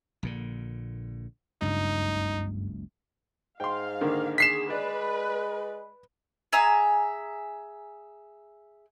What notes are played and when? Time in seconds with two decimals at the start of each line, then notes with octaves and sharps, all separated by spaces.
0.23 A#1 A#2 D3
1.62 F#1 C#2 G2 D#4
3.60 G#2 F5 G5 C6
4.01 D3 D#3 A#3
4.38 G#4 B6 C7 E7
4.70 G#3 B4 D5
6.53 G#4 E5 G#5 A#5